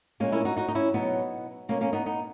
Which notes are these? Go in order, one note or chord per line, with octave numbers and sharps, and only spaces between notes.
A#2 G#3 A#3 C#4
C#4 E4
D#4 F#4
D#4 F#4
D#4
C#4 E4
B2 F#3 B3 D#4
B2 G#3 A#3 C#4
A#3 C#4
B3 D#4
B3 D#4